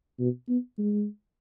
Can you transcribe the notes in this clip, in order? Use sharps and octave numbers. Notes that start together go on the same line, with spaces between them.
B2
B3
G#3